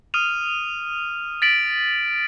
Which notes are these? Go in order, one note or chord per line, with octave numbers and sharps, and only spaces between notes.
D#6 F6 D#7 F7
A6 B6 D7 F#7